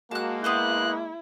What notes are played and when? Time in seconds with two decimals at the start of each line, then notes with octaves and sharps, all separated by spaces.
0.11 G#3 A#3 F#4 A5 F#6
0.44 B3 E4 B4 C5 F#6